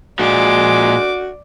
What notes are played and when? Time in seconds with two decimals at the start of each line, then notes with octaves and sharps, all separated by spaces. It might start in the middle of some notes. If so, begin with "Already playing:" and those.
0.19 A#2 F3 G#3 F#4 D5 D6